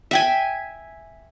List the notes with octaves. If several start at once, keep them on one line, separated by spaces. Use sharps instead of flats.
E5 G5 G#5